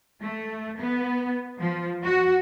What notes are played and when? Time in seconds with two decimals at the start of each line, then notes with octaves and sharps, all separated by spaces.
0.22 A3
0.79 B3
1.58 F3
2.04 F#4